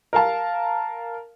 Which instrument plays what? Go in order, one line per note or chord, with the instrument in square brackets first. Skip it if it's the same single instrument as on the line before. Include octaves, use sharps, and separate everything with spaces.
[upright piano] A#4 F5 A5